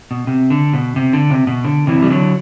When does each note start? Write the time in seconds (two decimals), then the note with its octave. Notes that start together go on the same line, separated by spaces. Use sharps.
0.11 B2
0.27 C3
0.50 D3
0.73 B2
0.96 C3
1.13 D3
1.30 C3
1.47 B2
1.65 D3
1.87 C3 E3
2.02 G3
2.10 D3 F#3